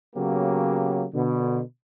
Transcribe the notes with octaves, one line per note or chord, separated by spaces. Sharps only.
C#3 F#3 A#3 B3 G4
B2 D3